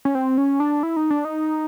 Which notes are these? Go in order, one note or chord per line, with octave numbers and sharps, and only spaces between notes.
C#4
C4
C#4
D4
E4
D#4
D4
D#4